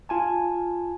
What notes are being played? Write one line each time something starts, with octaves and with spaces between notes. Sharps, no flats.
F4 G#5 A5